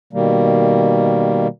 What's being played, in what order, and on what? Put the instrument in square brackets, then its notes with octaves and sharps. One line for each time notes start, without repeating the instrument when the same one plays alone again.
[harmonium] B2 D#3 G3 A#3